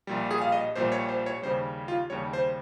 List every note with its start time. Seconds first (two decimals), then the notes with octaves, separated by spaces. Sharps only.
0.07 A#1 A#2 G3
0.31 G#4
0.41 F5
0.52 D#5
0.75 A#1 A#2 G3 C5
0.92 C#5
1.09 C5
1.26 C#5
1.42 D#2 C#3 G3 C5
1.88 F4
2.10 D#2 C#3 G3 C#5
2.33 C5